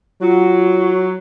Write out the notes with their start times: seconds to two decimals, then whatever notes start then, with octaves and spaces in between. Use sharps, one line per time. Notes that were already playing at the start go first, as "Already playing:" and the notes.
0.21 F#3 F4